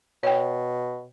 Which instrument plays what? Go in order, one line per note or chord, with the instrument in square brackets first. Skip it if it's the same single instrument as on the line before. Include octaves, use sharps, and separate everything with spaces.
[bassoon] B2 [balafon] C#5 G5